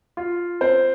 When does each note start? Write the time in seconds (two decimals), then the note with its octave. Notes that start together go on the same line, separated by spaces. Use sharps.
0.17 F4
0.61 C4 C5